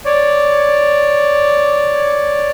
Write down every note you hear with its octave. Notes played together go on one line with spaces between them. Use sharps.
C#5 D5